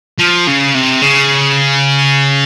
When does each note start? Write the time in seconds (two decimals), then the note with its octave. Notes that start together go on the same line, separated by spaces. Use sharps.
0.19 F3
0.47 C#3
0.75 C3
1.02 C#3